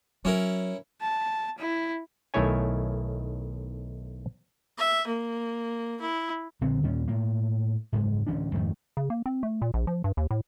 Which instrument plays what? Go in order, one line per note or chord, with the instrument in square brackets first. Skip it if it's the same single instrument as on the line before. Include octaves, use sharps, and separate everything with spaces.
[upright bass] F#3 [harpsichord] C#4 E4 A#4
[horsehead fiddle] A5
E4
[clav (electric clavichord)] B1 D#3 A3 E4 C#5 G#5
[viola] E5
A#3
E4
[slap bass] A#1 D3 C4
D#2 A#2 C#4
A2 A#3
F#1 G#2 G#3
D1 E3 C#4 D4
F2 G#2 D#3 A3
[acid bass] C#3
A#3
C4
A3
A#2
A#1
F3
G2
D#2
A2